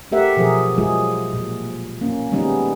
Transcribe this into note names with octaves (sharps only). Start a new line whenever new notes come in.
A3 G4 A#4 E5 F#5
B2 F3 F#3 G#4 A#4
F#3 G#3 F4 G#4
A#2
A#3 C#4
D#3 G3 G#3 B3 C#4 D#4